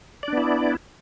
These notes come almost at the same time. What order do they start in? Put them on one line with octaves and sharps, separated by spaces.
D5 D4 B3 E4